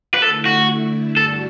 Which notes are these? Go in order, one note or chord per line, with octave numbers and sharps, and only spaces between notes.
B4
D3 A3 E4 A4
F#4
G2 D3 G3 D4 F#4 A4